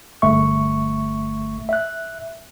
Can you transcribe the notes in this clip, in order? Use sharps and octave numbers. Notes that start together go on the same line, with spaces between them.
G1 A3 E5 C#6
E5 F#6